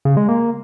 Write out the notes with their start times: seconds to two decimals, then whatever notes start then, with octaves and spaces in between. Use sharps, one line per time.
0.05 C#3
0.17 G#3
0.29 A#3